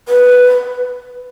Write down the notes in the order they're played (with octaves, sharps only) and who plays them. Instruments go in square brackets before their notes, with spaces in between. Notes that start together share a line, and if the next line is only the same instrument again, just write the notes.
[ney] B4